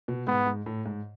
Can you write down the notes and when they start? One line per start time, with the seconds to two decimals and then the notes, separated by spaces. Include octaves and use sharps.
0.08 B2
0.27 G#2 B3
0.46 G#2
0.66 A2
0.86 G#2